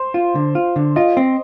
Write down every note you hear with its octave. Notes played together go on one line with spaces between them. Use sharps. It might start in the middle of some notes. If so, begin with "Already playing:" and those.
Already playing: C5
F4
D3
F4
D3
F4 D#5
C4